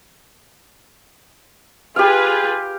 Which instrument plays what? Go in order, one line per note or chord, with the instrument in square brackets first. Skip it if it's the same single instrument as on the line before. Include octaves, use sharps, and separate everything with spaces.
[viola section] F4 G#4 B4 [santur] G4 F5